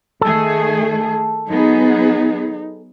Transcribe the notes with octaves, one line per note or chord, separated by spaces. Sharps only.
D#3 A3 G#4 A4
F#3 B3 D#4 G#4